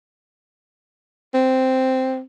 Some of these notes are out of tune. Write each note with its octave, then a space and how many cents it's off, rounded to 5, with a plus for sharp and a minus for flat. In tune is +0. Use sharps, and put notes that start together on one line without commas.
C4 -5